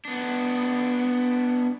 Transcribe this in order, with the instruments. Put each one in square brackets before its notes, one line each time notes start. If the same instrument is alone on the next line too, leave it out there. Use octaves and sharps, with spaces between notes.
[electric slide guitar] B3 D4